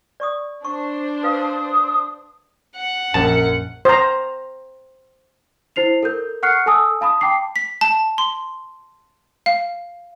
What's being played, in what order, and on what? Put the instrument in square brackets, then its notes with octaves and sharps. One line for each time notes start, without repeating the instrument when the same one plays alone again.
[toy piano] D5 C#6 D#6
[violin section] D4 C5 [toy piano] C#6
[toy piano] B4 F5 [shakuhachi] D#6
[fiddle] F#5
[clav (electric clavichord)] A#1 A5 [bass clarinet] F#2
[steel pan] C5 A#5
[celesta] E4 C5 C7 F7
A4 A#4 G6
F#5 C#6 F6 F#6 C7 C#7
A4 G#5 A5 D#6 E6
F5 A5 B5 D#6
G5 A5 D6 C7
[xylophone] B6
A5
C6
F5